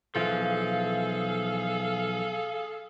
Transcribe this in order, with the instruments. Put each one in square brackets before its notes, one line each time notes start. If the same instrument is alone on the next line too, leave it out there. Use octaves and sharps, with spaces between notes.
[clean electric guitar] B1 E3 F3 [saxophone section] G#4 A4 F5